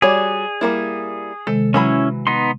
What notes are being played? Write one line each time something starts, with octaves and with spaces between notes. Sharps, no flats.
G3 F#4 G#4 C#5 D5 G5 D6
G3 A#3 E4
C3 D#3 G#3 A4
E3 F#3 C#4 E4 G#5 B5
B3 D#4 C6